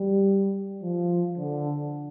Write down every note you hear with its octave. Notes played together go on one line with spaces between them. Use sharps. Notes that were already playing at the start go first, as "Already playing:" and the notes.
Already playing: G3
F3
D3